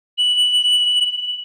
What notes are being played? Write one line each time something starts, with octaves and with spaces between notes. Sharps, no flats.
F#7